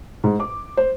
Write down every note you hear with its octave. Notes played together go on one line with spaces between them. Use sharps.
G#2
D6
C5